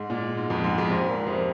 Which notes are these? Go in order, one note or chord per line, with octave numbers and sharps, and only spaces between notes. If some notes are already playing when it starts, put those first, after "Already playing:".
Already playing: G#2 G#3
A#2
G#2
F2
G#2
F2
G#2 C3
A#2
F2 C3